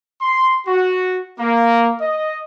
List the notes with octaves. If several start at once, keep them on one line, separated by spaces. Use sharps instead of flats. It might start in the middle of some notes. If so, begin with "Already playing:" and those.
C6
F#4
A#3
D#5